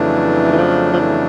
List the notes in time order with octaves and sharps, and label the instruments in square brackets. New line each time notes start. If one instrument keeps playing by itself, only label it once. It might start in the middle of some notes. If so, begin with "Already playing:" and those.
Already playing: [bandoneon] F2 C#3 F#3 A3 D4 [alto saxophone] E3
[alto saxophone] E3
F3
F3
E3